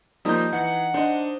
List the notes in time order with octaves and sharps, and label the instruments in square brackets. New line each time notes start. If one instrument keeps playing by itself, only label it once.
[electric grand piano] F3 G3 A#3 [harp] D#4 A#5 G6
[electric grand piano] E3 C#7 [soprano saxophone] F#5
[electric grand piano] D4 D#5 [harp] C5